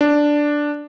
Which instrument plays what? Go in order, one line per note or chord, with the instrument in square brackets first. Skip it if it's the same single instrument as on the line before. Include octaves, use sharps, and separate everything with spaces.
[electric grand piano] D4